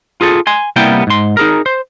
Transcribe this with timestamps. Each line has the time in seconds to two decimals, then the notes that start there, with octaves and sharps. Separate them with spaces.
0.21 F4 G#4 A4
0.47 G#5 C6
0.76 C2 G3 A#3 B3 E4 G5
1.07 G#2 C6
1.37 D#4 G#4 A#4
1.66 C5